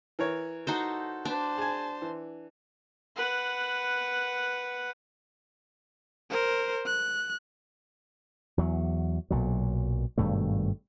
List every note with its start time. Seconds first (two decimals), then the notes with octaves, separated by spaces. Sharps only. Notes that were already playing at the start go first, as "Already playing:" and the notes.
0.19 E3 A#4 C#5
0.67 D#4 F#4 A4 C5
1.25 D4 C5 A5
1.58 G#4 G#5
2.02 E3
3.16 B4 F#5
6.31 A#4 C5
6.86 F#6
8.58 E2 F#3
9.31 B1 A#2 F#3
10.18 G#1 G2 B2 A3